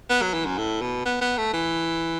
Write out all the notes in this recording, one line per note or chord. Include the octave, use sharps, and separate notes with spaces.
B3
F#3
E3
F#2
A2
B2
B3
B3
A3
E3